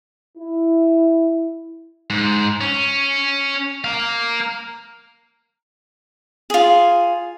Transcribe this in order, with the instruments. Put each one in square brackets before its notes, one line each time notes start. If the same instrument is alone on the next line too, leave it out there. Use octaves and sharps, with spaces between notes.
[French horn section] E4
[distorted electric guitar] G#2
C#4
A#4 F5
[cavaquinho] F4 G#4